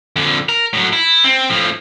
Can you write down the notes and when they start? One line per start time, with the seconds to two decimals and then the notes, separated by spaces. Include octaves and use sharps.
0.16 F2 D3
0.49 A#4
0.73 A2 F#3
0.93 E4
1.24 C4
1.49 A2 F3